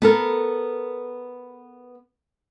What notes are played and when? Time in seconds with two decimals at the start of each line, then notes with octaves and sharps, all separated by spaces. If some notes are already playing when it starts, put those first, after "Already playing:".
0.02 B3 A4 A#4